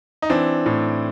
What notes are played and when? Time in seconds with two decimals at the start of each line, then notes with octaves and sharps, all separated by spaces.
0.22 D#4
0.30 E3 C4 D4
0.66 A2